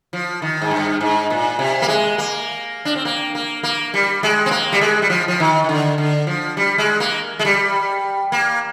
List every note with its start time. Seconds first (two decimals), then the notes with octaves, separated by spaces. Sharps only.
0.13 F3
0.42 D#3
0.62 G#2
0.71 G2
1.01 G#2
1.30 A#2
1.59 C3
1.82 A#3
1.88 G#3
2.18 A#3
2.85 D4
2.96 C4
3.05 A#3
3.35 A#3
3.63 A#3
3.94 G3
4.23 G#3
4.46 C4
4.51 A#3
4.72 G3
4.81 G#3
5.02 G3
5.10 F3
5.28 F3
5.40 D#3
5.64 D#3
5.69 D3
5.98 D3
6.27 F3
6.57 G3
6.78 G#3
7.00 A#3
7.39 G#3
7.45 G3
8.32 A#3